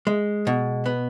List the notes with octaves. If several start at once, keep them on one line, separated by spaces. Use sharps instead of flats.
G#3
B2
B3